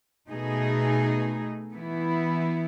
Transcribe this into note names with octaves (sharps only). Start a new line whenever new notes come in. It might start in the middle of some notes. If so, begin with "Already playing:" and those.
B2 A3 D#4 G#4
E3 B3 E4